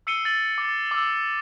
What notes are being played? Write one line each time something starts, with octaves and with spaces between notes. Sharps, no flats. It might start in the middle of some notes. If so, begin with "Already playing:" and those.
E6 C7 C#7 D#7 G7
A6 F#7
D6 A6
D6 E6